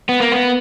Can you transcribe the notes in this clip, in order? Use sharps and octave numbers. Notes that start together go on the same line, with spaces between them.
B3
A#3
B3